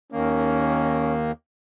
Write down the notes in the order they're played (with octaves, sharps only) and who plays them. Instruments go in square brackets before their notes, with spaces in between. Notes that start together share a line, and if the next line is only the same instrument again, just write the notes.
[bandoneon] D#2 D#3 A#3 [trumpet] C#4